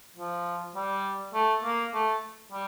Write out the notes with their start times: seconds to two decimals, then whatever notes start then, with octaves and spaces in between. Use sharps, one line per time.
0.16 F3
0.76 G3
1.34 A3
1.64 A#3
1.94 A3
2.52 G3